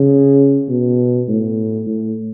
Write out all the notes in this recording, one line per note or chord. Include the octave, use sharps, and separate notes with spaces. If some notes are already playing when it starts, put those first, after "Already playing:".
Already playing: C#3
B2
A2
A2